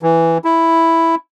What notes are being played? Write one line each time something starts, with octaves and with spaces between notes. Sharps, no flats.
E3
E4